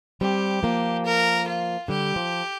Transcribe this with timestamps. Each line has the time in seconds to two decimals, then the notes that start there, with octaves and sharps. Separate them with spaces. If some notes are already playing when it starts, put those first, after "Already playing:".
0.21 G3 C4 G4
0.63 F3 A#3
1.05 A#4
1.47 F4
1.88 D3 G3 G4
2.16 F3